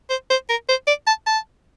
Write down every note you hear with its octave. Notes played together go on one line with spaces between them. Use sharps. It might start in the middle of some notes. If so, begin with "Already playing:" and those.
C5
C5
A#4
C5
D5
A5
A5